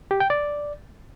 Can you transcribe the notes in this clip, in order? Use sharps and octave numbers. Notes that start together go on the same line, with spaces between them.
G4
G5
D5